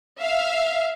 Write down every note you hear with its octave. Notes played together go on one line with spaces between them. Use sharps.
E5 F5